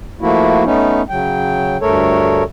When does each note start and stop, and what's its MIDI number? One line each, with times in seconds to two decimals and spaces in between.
0.21 0.64 53
0.21 0.64 57
0.21 0.64 58
0.21 0.64 64
0.21 0.64 66
0.64 1.02 57
0.64 1.02 59
0.64 1.02 61
0.64 1.02 63
1.09 1.77 49
1.09 1.77 54
1.09 1.77 79
1.81 2.43 38
1.81 2.43 43
1.81 2.43 57
1.81 2.43 69
1.81 2.43 70
1.81 2.43 73